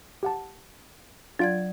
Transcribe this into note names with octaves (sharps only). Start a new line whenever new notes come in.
G4 F#5 A5
F#3 D4 F4 D5 F5 G#6